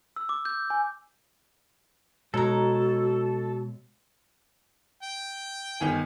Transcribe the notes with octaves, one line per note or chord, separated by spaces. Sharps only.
E6
D6
G6
G#5
B2 G#3 D#4 F#4 A4 C#5 A#5
G5
G1 D#3 G#5